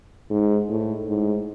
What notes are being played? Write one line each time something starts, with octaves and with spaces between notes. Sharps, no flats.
G#2
A2
G#2